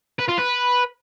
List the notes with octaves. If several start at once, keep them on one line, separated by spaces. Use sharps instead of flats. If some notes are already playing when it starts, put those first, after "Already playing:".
B4
F4
B4